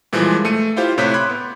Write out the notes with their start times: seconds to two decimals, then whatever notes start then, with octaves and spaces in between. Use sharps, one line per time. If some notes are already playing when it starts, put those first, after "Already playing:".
0.13 A#2 E3 F3 G3 G#3
0.45 A3 C#7 D#7
0.76 E4 F4 G4 C5 F5
0.98 A2 C3 C#5 F#6 G6 B6
1.14 B5 C6 D6 F#6 G#6
1.29 B3